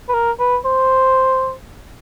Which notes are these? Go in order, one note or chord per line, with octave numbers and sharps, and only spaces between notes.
B4
A#4
B4
C5